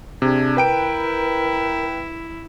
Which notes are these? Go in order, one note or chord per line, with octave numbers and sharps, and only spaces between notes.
C3 D4 G#4 G#6
E4 A#4 B4 G5 A#5 D7